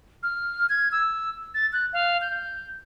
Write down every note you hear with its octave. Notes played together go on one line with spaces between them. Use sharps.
F6
G#6
E6
A6
F#6
F5
G6